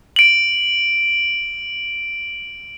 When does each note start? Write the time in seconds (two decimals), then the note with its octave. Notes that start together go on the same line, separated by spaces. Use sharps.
0.16 D7 F#7